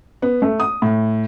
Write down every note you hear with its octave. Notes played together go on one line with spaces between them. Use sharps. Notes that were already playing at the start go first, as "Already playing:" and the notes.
B3
A3
D#6
A2